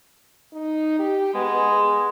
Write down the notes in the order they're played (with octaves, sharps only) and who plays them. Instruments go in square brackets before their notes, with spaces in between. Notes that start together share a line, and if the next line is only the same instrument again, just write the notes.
[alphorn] D#4
G4
[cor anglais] G#3 [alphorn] B3
[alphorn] G#4